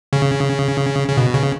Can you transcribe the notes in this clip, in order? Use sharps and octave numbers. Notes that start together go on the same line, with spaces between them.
C#3
C#3
B2
C#3